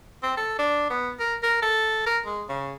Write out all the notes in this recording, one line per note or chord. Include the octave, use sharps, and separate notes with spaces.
C4
A4
D4
B3
A#4
A#4
A4
A#4
G#3
C#3